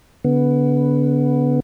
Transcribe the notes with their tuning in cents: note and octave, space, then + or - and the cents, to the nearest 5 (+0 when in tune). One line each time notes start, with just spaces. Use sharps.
D3 -40 B3 +0